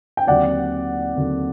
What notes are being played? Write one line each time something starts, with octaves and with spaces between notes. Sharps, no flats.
G5
D#2 D3 F#3 C4 D5 F#5
D#2 D3 F#3 C4